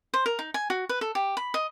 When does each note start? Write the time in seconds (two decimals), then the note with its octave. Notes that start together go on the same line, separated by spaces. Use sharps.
0.14 C5
0.26 A#4
0.39 D#4
0.54 G#5
0.70 F#4
0.89 B4
1.01 A4
1.15 G4
1.37 B5
1.54 D#5